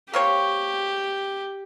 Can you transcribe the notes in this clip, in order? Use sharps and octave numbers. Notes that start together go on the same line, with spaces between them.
A#3 C4 G4 C#5